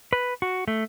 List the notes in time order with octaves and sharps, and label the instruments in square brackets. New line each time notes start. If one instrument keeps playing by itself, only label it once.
[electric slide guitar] B4
F#4
A3